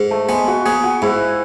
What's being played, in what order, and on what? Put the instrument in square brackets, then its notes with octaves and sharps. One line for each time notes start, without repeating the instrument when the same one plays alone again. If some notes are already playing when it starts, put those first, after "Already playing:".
Already playing: [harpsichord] G#2
[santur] A3
[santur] G#3 [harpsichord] B3
[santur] F#4
[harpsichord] B3 [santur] G#4
[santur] F#4
[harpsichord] G#2 [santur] E4